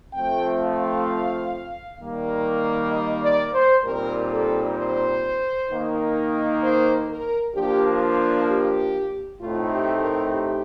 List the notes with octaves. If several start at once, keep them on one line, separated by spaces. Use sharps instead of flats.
F3 A3 C4 G5
F5
D#3 G3 A#3
D#5
D5
C5
A#2 G3 C4 D#4 A#4
A4
C5
D#3 A#3 D#4
C5
A#4
F3 A#3 D4 G4
G4
A2 A3 C4 D#4 F4
G4
A#4
G4